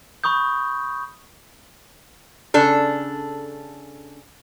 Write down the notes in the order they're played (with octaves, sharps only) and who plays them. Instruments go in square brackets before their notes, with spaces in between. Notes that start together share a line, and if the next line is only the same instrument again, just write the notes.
[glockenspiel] B5 C#6 D#6 G6
[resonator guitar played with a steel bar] C#3 D4 A4